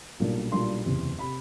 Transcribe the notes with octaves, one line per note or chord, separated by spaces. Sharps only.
B1 A#2 G3 A#3 D4
B1 A#2 G3 A#3 D4 C6
F#1 E2 C3
C3 B5